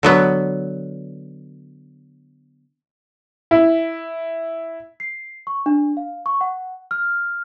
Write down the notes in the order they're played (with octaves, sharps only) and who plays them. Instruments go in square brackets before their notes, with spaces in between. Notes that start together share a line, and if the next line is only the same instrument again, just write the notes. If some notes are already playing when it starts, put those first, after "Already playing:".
[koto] D3 F#3 B3
[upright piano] E4
[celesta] C7
C#6
D4
F5
C#6
F#5
F6